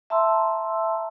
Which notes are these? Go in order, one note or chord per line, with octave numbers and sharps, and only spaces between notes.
E5 A5 A#5 C6 E6